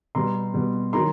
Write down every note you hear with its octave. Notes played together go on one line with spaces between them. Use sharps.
B2 G3 B3 A#5 C6
B2 G3 B3
D#3 F#3 A#5 C6